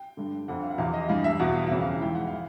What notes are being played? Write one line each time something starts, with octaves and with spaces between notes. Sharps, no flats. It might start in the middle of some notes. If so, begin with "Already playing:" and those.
Already playing: G5
G2 D3
F2 D3 F#5
F5
F#5
E2 C3 E3 F5
D#5
G2 E3 F5
E5
E2 B2 F#5
F5
F2 C#3 E3 E5
F5
G#2 E3 G5
F#5
F5
E3